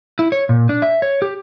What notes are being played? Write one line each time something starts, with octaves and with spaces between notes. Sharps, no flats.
E4
C#5
A#2
D4
E5
C#5
G4